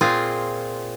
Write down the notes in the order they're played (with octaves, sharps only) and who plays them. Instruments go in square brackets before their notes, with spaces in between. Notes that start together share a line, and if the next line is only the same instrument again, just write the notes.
[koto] A#2 C4 F4 G#4